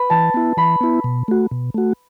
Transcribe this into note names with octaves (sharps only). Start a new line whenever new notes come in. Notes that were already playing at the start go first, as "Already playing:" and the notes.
Already playing: B4 B5
E3 A5
B3 E4
E3 B5
B3 E4
B2
A3 F#4
B2
A3 F#4